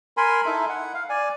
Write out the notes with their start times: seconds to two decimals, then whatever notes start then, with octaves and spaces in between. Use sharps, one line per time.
0.17 A#4 G#5 B5 C6
0.46 D#4 E4 A4 E5
0.69 F#5
0.94 F5
1.09 D5 G#5